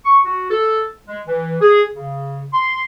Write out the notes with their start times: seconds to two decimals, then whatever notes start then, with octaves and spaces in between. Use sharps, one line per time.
0.05 C#6
0.25 F#4
0.51 A4
1.07 G#3
1.27 E3
1.62 G#4
1.95 C#3
2.53 C6